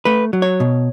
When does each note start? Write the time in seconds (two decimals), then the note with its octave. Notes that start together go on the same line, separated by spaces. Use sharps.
0.05 A3 B4
0.33 F#3
0.42 C#5
0.60 B2